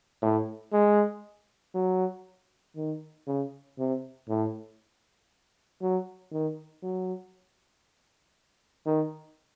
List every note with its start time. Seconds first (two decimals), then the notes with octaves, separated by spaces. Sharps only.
0.22 A2
0.73 G#3
1.75 F#3
2.76 D#3
3.27 C#3
3.78 C3
4.29 A2
5.81 F#3
6.32 D#3
6.83 F#3
8.86 D#3